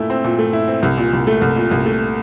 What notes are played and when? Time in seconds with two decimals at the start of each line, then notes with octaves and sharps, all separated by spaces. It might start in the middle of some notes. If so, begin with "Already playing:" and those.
Already playing: A#2 A3 E4
0.10 C4
0.24 A#2
0.39 A3
0.53 E4
0.68 C4
0.83 C2
0.98 A#2
1.13 C2
1.27 A3
1.41 C2
1.56 A#2
1.71 C2
1.86 A3